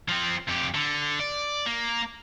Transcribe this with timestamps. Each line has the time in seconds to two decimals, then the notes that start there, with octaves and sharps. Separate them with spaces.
0.09 F3 C4
0.48 F2 G4
0.75 D3
1.20 D5
1.66 A#3